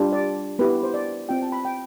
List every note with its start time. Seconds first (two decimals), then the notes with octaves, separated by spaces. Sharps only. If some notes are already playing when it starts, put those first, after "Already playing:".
Already playing: G3 D4 F4
0.13 D5
0.59 B3 E4 G4 B4
0.83 C5
0.94 D5
1.29 C4 F4 G5
1.42 A5
1.52 B5
1.65 G5